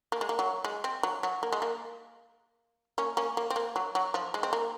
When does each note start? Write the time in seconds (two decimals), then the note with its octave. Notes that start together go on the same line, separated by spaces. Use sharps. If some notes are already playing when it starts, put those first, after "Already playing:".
0.12 A#3
0.21 G#3
0.29 A#3
0.39 F#3
0.64 G#3
0.84 C4
1.03 F#3
1.23 F#3
1.43 A#3
1.52 G#3
1.62 A#3
2.98 A#3 C#4
3.17 A#3 C#4
3.37 A#3
3.50 C4
3.56 A#3
3.76 F#3
3.95 F#3
4.14 F3
4.34 G#3
4.43 C4
4.53 A#3